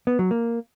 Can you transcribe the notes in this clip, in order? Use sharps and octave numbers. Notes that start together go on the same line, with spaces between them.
B3
F#3
A#3